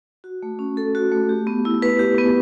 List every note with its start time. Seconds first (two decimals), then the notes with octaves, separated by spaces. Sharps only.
0.24 F#4
0.43 A3
0.59 C#4
0.77 A4
0.95 F#4
1.12 A3
1.29 G4
1.47 B3
1.65 E4
1.82 B4
1.99 G4
2.18 B3